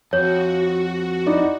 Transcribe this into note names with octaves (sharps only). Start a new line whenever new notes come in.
F2 F#4 C#5
D#4 E4 D5